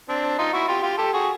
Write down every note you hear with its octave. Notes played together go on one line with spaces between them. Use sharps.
C4 D4
D#4 F4
E4 F#4
F4 G4
F4 G4
G4 A4
F#4 G#4